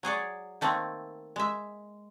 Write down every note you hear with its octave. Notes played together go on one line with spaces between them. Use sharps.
F#3 G#4 C#5 D5
D#3 A3 A#3 C4
G#3 E5